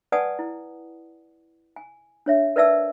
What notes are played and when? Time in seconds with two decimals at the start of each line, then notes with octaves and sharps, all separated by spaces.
0.12 B4 D5 F#5 G#5 A5 D#6
0.39 E4
1.76 G#5
2.26 D4 C#5 E5
2.56 A#4 B4 D5 E5 A5 E6